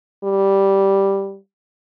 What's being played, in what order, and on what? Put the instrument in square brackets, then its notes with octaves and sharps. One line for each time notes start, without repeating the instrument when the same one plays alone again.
[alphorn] G3